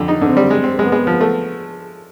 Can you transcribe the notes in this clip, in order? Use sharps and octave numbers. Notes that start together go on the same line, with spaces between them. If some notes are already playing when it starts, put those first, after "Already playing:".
Already playing: F2 D3
D#4
D3 C4
G3
G#3
C4
G#3 B3
G#3
F3
A3